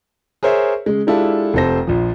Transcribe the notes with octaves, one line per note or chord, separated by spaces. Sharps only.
G#4 A#4 C5 C#5 E5 G#5
C#3 G#3
G#3 D4 E4 F4 G4 A4
F1 C3 A4 C5 A#6
A#1 F3